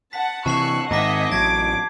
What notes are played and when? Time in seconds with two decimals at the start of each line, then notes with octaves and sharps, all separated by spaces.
0.13 F#5 A5 B6
0.46 C3 E3 A5 C#6 E6 F#6 C7 F#7
0.91 G#2 D#3 D#5 E5 F#5 A#5 D6 B6
1.32 A1 F#3 A5 D6 G#6 A#6